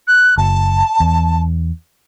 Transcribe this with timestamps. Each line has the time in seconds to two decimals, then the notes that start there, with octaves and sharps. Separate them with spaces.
0.08 F#6
0.37 F#1 A5
1.00 E2